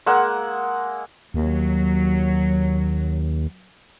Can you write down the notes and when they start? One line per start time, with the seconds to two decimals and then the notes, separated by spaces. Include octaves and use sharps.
0.06 G#3 A#3 F#5 E6
1.34 D#2 F#3